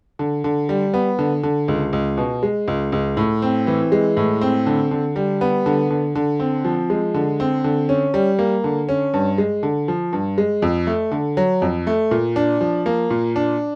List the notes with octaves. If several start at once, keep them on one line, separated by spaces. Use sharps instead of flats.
D3
D3
G3
B3
D3
D3
C#2
C#2
B2
G#3
C#2
C#2
A2
C4
E3
G#3
A2
C4
D3
D3
G3
B3
D3
D3
D3
C4
F3
G#3
D3
C4
D3
C#4
G3
A#3
D3
C#4
G2
G#3
D3
F3
G2
G#3
F2
A3
D3
F#3
F2
A3
A#2
D4
F3
A#3
A#2
D4